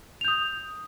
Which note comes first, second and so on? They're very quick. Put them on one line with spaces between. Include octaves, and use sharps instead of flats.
F7 G6 D#6